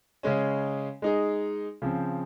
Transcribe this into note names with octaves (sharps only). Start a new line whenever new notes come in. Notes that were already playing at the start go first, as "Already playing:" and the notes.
C#3 G#3 C#4
G#3 D#4 G#4
C#3 F3 C4